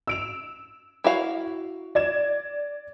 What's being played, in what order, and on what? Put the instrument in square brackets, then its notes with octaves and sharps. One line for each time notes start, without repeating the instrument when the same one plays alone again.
[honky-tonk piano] E6 D7 F7
[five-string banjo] E4 F#4 F5
[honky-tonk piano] D5 G#6 E7